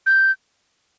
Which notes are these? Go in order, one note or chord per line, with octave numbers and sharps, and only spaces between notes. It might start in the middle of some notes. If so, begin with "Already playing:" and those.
G6